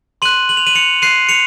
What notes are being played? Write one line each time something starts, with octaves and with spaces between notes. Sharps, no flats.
C6 F#6 D#7 F#7
F#7
F7
D#7 F#7
C#7 F7
C6 F#6 C7 D#7
C#7 F7